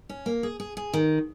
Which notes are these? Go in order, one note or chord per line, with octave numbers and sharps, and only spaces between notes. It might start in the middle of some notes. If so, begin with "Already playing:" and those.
C#4
A#3
G#4
G#4
G#4
D#3